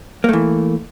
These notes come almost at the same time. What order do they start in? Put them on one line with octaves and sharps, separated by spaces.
A#3 A3 E3